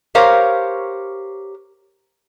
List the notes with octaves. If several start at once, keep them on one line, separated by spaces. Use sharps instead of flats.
G4 A#4 C5 C#5 F5